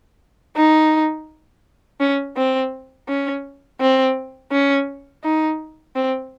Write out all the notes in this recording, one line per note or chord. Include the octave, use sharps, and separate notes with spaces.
D#4
C#4
C4
C#4
C4
C#4
D#4
C4